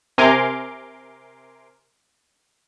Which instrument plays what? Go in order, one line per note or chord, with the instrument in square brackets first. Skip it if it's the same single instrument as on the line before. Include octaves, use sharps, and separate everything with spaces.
[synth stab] C3 A#4 G#5 C6 D6